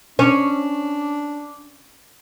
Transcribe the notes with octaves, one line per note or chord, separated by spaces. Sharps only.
C#4 D4